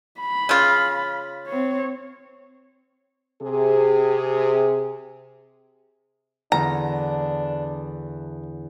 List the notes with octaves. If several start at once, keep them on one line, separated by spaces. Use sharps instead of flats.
B5
C#3 F4
C4 C#5
C3 G#4
E2 D3 D4 A#5 F6